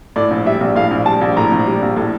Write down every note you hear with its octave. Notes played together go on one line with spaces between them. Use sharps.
A2 D5
A#1
G3 E5
A#1
A2 F5
A#1
G3 A5
A#1
A2 A#5
A#1
G3
A#1
A2